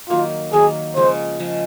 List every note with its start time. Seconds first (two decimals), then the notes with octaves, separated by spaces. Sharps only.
0.10 D#3 F#3 A#3 F4
0.53 D#3 F#3 A#3 G#4
0.96 C#3 F3 G#3 C5
1.40 C#3 F3 G#3